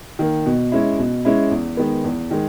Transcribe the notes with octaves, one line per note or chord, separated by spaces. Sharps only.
D#3 A#3
B2
G#3 C#4 E4
B2
G#3 C#4 E4
E2
D#3 G#3 B3
E2
D#3 G#3